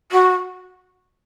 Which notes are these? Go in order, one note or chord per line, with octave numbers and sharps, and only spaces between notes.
F#4